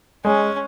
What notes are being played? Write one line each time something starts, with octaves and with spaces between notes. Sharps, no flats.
G#3 C#4